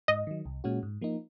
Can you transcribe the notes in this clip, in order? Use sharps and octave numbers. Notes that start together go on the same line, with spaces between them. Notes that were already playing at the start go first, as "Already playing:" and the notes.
G#2 D#5
D#3 F#3
C2
A#2 G#3 C#4 F#4
G#2
F3 A#3 D#4